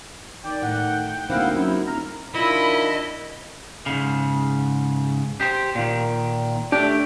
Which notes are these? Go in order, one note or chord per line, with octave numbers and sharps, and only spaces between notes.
D#3 D5 G5
A2 F#5
D2 A#3 C4 D#4 E4 F5 F#5
F#2 E4
D#1 A#4 A#5
D#3 D4 E4 F4 D#5 B5
G#2 C#3
G4 C5
A#2 D#3
A3 D4 G4